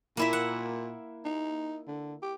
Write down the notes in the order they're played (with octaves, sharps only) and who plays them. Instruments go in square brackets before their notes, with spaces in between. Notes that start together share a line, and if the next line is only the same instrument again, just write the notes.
[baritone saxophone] A#2 [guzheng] A#3 E4 E5
[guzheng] F#5
[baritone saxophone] D#4
D3
G4